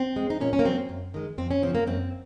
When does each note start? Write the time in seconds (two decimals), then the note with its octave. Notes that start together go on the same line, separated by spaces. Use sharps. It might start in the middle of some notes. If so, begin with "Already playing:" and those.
Already playing: C4
0.16 G#3
0.30 D#4
0.41 A#2 C#4
0.53 C#4
0.59 A#3
0.65 F#3 C4
0.89 F#2
1.14 D#3 G#3
1.38 F2 C4
1.51 C#4
1.63 C#3 F3 C4
1.75 A#3
1.87 F#2 C4